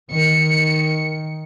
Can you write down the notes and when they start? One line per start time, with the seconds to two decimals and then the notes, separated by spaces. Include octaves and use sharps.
0.11 D#3 C#7